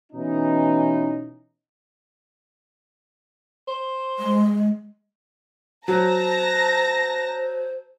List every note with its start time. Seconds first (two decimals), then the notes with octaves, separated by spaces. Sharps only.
0.13 B2 E3 C#4 D#4
3.68 C5
4.19 G#3
5.88 F#3 C5 A5 A#5 A#6